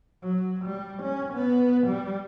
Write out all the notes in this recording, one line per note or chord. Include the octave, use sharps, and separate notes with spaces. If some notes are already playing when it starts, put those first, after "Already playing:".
F#3
G3
C#4
B3
G3